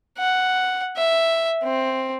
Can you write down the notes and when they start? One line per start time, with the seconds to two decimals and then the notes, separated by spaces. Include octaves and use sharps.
0.18 F#5
0.96 E5
1.63 C4